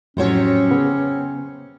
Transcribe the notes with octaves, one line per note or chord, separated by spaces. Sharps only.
F2 A2 C3 F#3 C#4 C5 C#5
C#3 B3